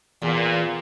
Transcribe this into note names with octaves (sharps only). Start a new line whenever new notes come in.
E2 A#2